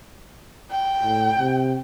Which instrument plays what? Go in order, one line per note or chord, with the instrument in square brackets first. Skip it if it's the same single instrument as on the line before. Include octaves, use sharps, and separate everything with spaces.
[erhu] G5
[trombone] A2
C3